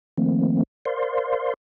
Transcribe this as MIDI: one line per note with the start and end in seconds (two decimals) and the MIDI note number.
0.18 0.63 51
0.18 0.63 53
0.18 0.63 57
0.18 0.63 58
0.18 0.63 60
0.85 1.54 70
0.85 1.54 72
0.85 1.54 74
0.85 1.54 77
0.85 1.54 84